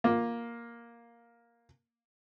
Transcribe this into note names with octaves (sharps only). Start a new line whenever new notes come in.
A#3 F4